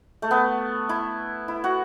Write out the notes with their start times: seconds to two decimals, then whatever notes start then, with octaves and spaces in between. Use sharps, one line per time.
0.22 A3
0.31 B3
0.89 E4
1.48 E4
1.64 F#4